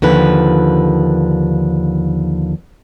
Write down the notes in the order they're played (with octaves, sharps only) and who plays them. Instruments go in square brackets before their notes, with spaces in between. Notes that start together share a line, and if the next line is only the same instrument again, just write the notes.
[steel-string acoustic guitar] D#2 D3 F3 B4